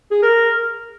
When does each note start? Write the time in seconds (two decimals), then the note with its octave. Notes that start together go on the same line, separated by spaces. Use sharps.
0.11 G#4
0.22 A#4